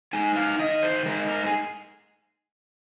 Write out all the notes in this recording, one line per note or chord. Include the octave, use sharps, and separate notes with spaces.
G#3 D#4 G#5
F5
D#3 D#5
C5
G#3 D#4 A#4
A#4
G#4